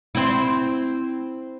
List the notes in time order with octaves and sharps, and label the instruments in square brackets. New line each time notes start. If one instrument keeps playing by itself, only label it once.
[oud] C4 E4